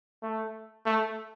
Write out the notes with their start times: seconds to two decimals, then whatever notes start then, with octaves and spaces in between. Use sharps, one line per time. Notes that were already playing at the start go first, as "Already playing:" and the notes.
0.22 A3
0.86 A3